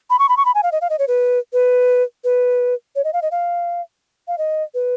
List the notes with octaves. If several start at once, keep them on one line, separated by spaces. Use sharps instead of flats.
B5
C#6
B5
C#6
B5
G#5
F5
D#5
F5
D#5
C#5
B4
B4
B4
C#5
D#5
F5
D#5
F5
F5
D#5
B4